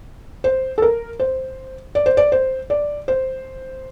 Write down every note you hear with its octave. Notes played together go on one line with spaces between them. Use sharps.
C5
A4
A#4
C5
D5
C5
D5
C5
D5
C5